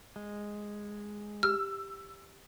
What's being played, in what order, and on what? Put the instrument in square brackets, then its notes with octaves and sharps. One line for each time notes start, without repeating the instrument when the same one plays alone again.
[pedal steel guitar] G#3
[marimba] G4 [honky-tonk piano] E6 [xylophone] F6